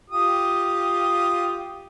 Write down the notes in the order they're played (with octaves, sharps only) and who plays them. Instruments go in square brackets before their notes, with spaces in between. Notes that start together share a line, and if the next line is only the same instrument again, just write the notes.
[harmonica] F4 G4 D#6